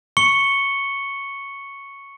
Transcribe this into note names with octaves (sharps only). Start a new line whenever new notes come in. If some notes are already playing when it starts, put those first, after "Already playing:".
C#6 C#7 G7